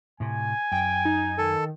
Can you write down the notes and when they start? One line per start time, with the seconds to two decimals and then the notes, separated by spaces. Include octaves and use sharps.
0.20 A2 C3 G#5
0.72 F#2 G5
1.05 D#4
1.38 D#3 A4